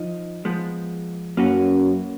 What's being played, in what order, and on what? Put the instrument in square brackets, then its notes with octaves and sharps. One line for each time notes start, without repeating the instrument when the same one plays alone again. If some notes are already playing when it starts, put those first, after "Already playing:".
Already playing: [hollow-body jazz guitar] F3 D#4
F3 G#3 B3
[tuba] F#2 [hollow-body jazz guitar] A#3 C#4 F#4 B4